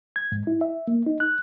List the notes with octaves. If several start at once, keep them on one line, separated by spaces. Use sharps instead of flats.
G#6
G#2
E4
E5
A#3
D#4
F#6